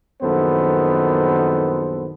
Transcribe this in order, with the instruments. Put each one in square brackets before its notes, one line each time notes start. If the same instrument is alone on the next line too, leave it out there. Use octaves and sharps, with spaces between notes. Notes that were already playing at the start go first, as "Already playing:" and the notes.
[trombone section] A#1 F#2 D#3 B3 A4 C5